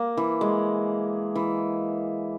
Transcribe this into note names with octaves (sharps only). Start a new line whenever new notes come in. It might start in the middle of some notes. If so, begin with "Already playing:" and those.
Already playing: A#3
E3
G#3
E3